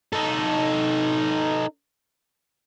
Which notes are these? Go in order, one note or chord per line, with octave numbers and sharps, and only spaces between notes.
D#4 A4